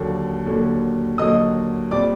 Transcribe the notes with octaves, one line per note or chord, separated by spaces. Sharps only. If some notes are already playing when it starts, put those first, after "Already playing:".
Already playing: D#2 D3 F#3 A#3
D#2 D3 F#3 A#3
D#2 D3 F#3 A#3 D#5 D#6
A#2 G3 C4 D5 D6